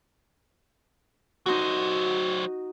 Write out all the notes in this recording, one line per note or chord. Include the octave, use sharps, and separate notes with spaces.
F#3 D#4 F#4 C5